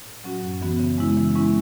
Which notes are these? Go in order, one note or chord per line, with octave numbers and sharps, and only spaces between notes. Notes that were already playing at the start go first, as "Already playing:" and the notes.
A2
F#3 C#4 F#4
F#2
E3 B3 F#4
C#3
G#3 C#4 E4
E3
G#3 C#4 E4